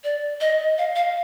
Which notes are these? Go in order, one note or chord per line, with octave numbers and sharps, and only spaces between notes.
D5
D#5
F5
F5